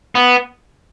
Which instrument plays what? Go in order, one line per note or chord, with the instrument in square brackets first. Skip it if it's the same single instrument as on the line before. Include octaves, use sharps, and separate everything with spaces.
[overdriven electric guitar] B3